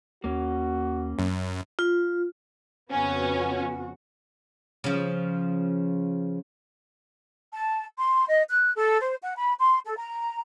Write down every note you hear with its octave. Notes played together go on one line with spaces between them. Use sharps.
D#2 A#3 C#4 F#4
F#2
F4
F2 C#3 B3 C#4 F#4
C#3 F3
A5
C6
D#5
F#6
A4
C5
F#5
B5
C6
A4
A#5